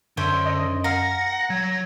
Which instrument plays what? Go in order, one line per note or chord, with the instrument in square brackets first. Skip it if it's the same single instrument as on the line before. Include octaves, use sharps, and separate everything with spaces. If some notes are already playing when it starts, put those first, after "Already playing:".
[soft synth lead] F#2 [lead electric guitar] D3 [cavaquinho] C5 C#5 E5
[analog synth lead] D#5
[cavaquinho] A#4 F5 [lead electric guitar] F#5 [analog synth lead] A#6
[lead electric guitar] F#3 [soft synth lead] G#6